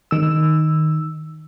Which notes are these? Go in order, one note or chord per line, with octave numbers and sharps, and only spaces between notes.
D#3 E6